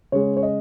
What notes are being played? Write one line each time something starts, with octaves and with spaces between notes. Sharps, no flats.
C#3 G#3 C#5
C#5
D#5